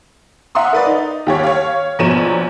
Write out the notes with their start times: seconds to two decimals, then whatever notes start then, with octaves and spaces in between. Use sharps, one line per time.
0.55 E5 F#5 A#5 C6 D#6
0.73 A#4 B4 D5
0.86 D#4
1.27 D#2 G4 C#5
1.44 C#5 F5
1.99 A#1 B2 C#5 A#5 D#7 E7